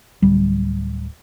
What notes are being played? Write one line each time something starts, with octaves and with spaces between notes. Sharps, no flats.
D1 G3